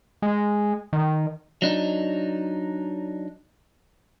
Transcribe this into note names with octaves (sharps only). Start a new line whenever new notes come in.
G#3
D#3
F#3 D4 D#4